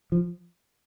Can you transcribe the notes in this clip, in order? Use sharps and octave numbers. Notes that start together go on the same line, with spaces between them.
F3